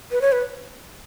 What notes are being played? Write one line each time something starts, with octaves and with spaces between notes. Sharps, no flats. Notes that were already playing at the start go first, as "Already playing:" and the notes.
B4
C#5
B4